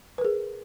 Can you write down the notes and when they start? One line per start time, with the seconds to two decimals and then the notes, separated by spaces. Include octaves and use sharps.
0.18 B4
0.21 A#4
0.25 G#4